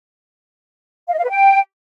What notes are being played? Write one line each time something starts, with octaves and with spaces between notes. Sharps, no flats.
F5
D#5
F5
B4
G5